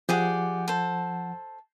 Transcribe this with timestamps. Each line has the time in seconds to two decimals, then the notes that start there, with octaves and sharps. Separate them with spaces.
0.09 F3 G4 G#4 D5 F#5
0.68 A4 C5